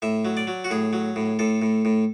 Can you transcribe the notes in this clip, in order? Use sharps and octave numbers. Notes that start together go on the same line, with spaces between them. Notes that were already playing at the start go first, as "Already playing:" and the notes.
A2 E5
F#3
D5
F#3
F#4
A2 G#4
F#3
A2
A2 A4
A2
A2